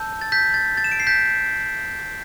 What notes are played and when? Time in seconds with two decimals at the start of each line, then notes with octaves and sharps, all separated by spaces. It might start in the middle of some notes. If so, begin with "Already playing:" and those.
Already playing: A5 E6 G6
0.21 A6
0.32 G6 B6
0.54 A6
0.77 A6
0.84 E7
0.92 D7
1.00 C7
1.07 G6 B6